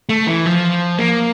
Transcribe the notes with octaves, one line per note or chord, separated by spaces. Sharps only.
A3
E3
F3
A#3